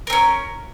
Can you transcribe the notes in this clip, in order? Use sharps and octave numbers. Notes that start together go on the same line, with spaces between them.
C4 C#4 A#4